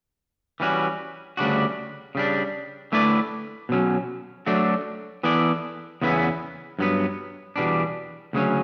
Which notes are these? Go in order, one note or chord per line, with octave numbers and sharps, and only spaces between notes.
E3 G3 C#4 F#4
D2 C#3 G3 D4 F#4
C#3 G3 D4
D3 A3 E4 B4 D5
B2 F#3 C#4
F#3 A3 D4 F#4
E3 B3 E4 A4 D5
E2 C#3 E3 B3 E4
G2 F#3 B3
E2 B2 G3 D4
D2 C#3 F#3 C#4